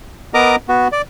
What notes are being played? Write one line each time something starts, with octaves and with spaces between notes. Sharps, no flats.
B3 A#4 D#5 A#5 D6
B3 F#4
D5